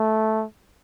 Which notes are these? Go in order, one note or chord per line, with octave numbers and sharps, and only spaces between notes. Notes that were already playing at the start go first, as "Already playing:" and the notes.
Already playing: A3